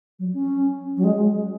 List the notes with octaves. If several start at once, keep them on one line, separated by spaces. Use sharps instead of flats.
F#3
C#4
F#3
G#3